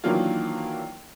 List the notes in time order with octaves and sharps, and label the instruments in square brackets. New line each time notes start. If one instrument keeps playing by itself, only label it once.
[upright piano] D#3 E3 F#3 A#3 D4 F4